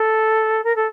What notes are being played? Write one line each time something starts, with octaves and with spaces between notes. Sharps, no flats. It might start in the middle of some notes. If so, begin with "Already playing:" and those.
Already playing: A4
A#4
A4